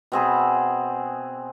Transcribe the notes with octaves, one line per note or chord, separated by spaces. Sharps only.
B2 C4 G#4 B5